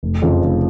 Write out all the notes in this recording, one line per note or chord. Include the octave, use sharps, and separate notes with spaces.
F1
F2 C#3 F3
F1